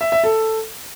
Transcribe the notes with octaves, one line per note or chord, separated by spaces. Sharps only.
E5
E5
A4